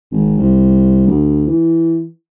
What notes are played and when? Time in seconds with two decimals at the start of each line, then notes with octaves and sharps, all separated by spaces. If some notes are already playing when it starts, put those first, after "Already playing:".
0.11 G#1
0.38 C2
1.07 D2
1.47 E3